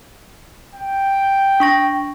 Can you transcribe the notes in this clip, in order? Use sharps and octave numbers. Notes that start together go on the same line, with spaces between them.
G5
D4 C#6 A#6